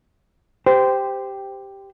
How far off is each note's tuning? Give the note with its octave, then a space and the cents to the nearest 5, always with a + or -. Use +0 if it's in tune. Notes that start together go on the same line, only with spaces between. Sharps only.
G4 +0 C5 -15